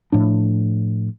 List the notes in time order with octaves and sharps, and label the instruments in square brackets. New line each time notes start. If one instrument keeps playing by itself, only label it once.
[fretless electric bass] A2 F3 D4